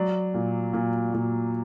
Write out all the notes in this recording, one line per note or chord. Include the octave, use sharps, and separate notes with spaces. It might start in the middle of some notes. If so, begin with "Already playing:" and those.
Already playing: F#3 D5
A#2
A#2
A#2